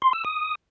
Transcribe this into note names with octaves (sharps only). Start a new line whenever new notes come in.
C6
E6
D#6